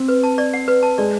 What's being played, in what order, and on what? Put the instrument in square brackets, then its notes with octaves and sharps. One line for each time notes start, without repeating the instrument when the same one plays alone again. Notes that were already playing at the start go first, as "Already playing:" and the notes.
Already playing: [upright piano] C4
[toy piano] B4
A5
D5
F#5
B4
A5
[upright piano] G#3 [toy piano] D5